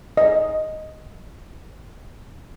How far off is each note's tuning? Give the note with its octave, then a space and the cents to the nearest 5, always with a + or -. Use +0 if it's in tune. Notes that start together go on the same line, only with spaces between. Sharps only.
D#5 +0